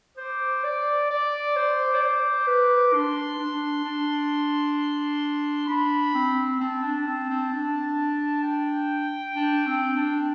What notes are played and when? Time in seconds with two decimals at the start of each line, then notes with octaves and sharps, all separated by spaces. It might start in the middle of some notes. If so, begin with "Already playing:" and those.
0.17 C5 D6
0.64 D5
1.10 D5
1.56 C5
1.95 D5
2.01 C5
2.47 B4
2.93 D4 C6
3.38 D4
3.84 D4
5.68 D4 B5
6.14 C4
6.60 C4 A5
6.83 D4
7.06 C4
7.30 C4
7.52 D4
8.43 G5
9.36 D4
9.67 C4
9.97 D4